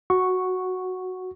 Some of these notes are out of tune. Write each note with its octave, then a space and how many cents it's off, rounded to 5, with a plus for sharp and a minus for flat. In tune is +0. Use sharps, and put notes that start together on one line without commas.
F#4 +0 F#5 +0 C#6 +0